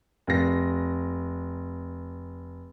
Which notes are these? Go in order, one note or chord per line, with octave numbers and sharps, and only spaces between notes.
F1 A#6